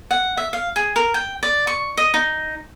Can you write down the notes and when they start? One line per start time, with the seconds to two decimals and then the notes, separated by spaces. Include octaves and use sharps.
0.11 F#5
0.37 E5
0.53 F5
0.76 G#4
0.96 A#4
1.14 G5
1.43 D5
1.67 C#6
1.97 D#5
2.14 D#4